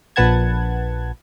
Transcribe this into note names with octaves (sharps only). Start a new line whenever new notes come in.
A#1 A#2 B4 F#5 A5 G#6